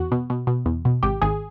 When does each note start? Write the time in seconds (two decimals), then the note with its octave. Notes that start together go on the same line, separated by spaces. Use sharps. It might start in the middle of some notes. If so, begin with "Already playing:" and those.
Already playing: E2 F#4
0.11 B2
0.30 B2
0.47 B2
0.66 E2
0.85 B2
1.03 G#1 G4
1.22 G#1 G#4